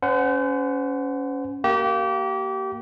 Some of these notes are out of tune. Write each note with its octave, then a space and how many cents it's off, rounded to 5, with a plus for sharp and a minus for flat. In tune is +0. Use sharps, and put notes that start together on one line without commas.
C#4 +10 C5 -40 F#5 +5
A#3 -5 G4 -30